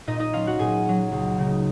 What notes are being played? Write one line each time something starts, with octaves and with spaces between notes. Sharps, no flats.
A#2 D#4 D#5
D#4 D#5
F#3 C#4 F4 F5
F#4 F#5
A#2 G#4 G#5
F#3 C#4
C#2
C#3 G#3 D#4